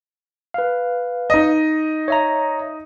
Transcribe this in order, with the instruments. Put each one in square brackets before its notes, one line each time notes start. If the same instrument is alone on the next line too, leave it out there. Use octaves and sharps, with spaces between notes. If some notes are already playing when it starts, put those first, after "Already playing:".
[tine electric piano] B4 F5
[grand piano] D#4 D#5
[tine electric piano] C#5 E5 A#5